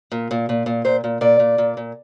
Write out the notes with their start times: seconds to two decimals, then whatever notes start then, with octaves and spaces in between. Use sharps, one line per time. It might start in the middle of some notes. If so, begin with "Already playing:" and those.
0.12 A#2
0.31 A#2
0.49 A#2
0.66 A#2
0.85 A#2 C5
1.04 A#2
1.21 A#2 D5
1.39 A#2
1.58 A#2
1.77 A#2